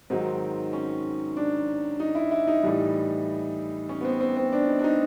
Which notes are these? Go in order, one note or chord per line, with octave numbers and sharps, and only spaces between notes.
G#2 D#3 F#3 C4
C#4
D4
D#4
E4
E4
D#4
A2 E3 G3
C#4
B3
C4
C4
C4
D4
D#4
D4
D#4